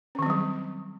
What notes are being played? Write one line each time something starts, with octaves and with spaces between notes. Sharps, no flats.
D#3 F#3 G3 C4 C#4